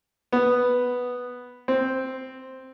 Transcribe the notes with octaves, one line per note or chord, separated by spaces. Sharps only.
B3
C4